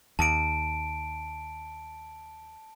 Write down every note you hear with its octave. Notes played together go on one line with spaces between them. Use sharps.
D#2 A5 D7